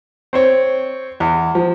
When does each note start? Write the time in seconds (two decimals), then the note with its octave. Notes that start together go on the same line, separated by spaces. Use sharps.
0.33 C4 C5 C#5
1.20 E2
1.55 F3